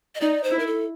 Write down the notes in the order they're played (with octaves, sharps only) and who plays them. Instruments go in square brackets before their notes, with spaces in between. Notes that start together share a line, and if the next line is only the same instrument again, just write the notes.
[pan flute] D#5
[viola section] D#4 [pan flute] D5
[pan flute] C5
[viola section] E4
[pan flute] A#4
A4